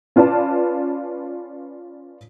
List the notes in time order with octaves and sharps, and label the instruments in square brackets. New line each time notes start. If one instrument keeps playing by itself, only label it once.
[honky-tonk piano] C#4 F4 B4 D5 A5